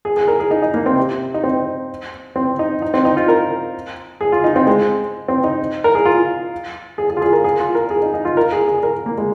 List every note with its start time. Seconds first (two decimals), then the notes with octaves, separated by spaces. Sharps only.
0.05 G#4
0.17 G#4
0.28 A#4
0.40 G#4
0.51 D#4
0.62 D#4
0.74 A#3
0.86 C4
0.97 C3
1.34 D#4
1.44 C4
2.36 C4
2.59 D#4
2.82 D#4
2.94 C4
3.05 D#4
3.17 F4
3.28 A#4
4.21 G#4
4.32 F4
4.44 D#4
4.56 C4
4.67 G#3
5.28 C4
5.44 D#4
5.84 A#4
5.95 G#4
6.05 F4
6.98 G#4
7.10 G#4
7.17 F4
7.22 G#4
7.33 A#4
7.44 G#4
7.60 F4
7.75 A#4
7.90 G#4
8.02 D#4
8.14 D#4
8.25 F4
8.37 A#4
8.52 G#4
8.67 G#4
8.83 A#4
9.06 A#3
9.18 G#3